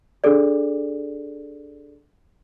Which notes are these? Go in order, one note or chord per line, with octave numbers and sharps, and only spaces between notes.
D4 G#4 A4 D5